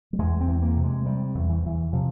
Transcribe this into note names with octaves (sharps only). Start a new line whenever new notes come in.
G3
E2 G#3
C4
E2
A#3
C3
G#3
C3 G3
E2
E3
E2 E3
C3 F3